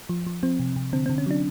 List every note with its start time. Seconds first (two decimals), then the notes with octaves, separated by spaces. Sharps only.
0.09 F3
0.27 F3
0.43 F3 C4
0.59 C3
0.76 C3
0.93 D3 C4
1.06 D3 C4
1.18 C#4
1.26 F#3 D4